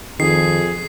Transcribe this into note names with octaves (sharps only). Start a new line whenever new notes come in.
F2 D#3 G#4 C7